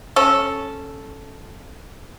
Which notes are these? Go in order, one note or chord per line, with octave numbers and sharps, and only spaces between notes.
C#4 A4